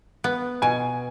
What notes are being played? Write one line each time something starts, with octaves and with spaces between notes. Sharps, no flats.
B3
B2 G#5